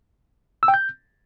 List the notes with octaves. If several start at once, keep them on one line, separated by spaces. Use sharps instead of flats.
E6
G5
G6